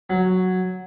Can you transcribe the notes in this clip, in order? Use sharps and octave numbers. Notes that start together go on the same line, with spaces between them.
F#3